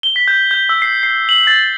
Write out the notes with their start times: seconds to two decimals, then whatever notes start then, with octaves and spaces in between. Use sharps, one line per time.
0.03 G7
0.16 B6
0.28 G6
0.51 G6
0.69 E6
0.82 C7
1.03 C7
1.29 F#7
1.47 A6